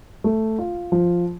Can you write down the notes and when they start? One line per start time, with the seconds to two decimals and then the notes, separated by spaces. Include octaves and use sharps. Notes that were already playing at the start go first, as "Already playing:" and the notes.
0.24 A3
0.59 F4
0.92 F3